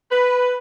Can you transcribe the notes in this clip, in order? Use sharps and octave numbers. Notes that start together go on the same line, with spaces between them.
B4